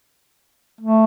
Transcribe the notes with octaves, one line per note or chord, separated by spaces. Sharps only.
A3